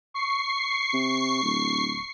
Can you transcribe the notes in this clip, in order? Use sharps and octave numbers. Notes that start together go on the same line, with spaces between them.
C#6 C7
C3
D1